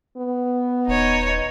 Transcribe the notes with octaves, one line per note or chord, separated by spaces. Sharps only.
B3
D#1 D#4 C#5